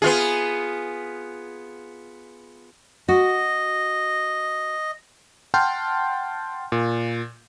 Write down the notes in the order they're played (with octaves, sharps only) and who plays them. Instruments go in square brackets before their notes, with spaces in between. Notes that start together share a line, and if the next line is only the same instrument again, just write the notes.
[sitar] B3 F4 G#4
[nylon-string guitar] F#4 [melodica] D#5
[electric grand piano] F#5 G5 A5 C6 F6 G6
A#2